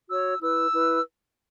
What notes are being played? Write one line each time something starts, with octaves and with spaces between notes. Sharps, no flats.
F#4 C#5 E6
E4 B4 E6
E4 B4